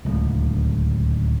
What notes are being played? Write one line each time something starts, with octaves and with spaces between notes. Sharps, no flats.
D1 C#2